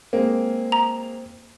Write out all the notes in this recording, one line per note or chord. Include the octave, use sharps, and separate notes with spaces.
G#3 A#3 C4
A#5